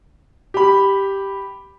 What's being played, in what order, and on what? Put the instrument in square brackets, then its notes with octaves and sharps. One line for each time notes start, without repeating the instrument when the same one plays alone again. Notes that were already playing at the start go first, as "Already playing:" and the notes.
[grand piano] G4 B5